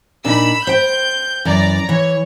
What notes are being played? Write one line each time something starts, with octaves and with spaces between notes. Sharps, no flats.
A#2 D4 D#4 B5 E6
C5 G5 G6
F#2 E3 D5 A#5
E3 C#5